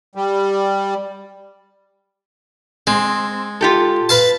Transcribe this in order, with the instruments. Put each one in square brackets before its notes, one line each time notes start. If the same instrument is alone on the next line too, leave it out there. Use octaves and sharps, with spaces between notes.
[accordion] G3
[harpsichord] G#3 [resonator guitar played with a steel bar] C4
[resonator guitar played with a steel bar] F4 G4 A4
[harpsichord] B4 F5 A5